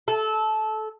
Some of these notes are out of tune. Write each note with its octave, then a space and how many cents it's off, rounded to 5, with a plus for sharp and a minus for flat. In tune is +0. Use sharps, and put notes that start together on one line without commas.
A4 -20